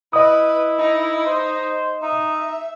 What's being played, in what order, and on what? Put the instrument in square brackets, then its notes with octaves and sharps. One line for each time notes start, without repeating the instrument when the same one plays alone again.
[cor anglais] E4 [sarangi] B4 [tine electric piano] D#5 D#6
[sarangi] D#4
[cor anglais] C5
[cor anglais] D#4 [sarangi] E5